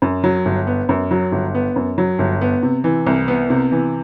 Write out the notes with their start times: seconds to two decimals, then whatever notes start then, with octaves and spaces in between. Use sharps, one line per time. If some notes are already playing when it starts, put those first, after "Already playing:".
0.02 F#2
0.24 F#3
0.45 G1
0.67 B3
0.89 F#2
1.11 F#3
1.32 G1
1.55 B3
1.76 F#2
1.98 F#3
2.19 G1
2.41 B3
2.63 C3
2.84 E3
3.07 C2
3.28 B3
3.50 C3
3.72 E3